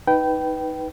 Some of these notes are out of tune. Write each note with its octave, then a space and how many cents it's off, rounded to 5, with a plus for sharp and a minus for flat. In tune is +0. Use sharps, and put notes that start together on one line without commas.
D#4 +10 B4 +0 G5 -20